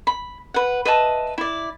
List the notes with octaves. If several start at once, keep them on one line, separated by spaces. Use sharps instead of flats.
B5
B4 F#5
B4 D#5 E5 A5
E4 D5